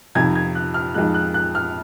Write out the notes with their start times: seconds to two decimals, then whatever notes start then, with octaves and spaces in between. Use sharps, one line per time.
0.15 F2 C3 D#3 G#6
0.35 G#6
0.55 F#6
0.74 F6
0.94 F2 D#3 G#3 F#6
1.14 F#6
1.34 F#6
1.55 F6